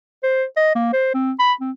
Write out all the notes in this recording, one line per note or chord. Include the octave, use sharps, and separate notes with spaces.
C5
D#5
A#3
C5
C4
B5
C4